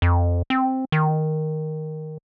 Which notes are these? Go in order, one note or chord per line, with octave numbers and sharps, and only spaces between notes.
F2
C4
D#3